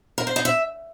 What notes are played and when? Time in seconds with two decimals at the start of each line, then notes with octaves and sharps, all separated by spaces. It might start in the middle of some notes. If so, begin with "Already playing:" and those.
0.18 A#4
0.27 C5
0.36 D#4
0.45 E5